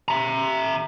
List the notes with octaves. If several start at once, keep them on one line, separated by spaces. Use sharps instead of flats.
E5 A#5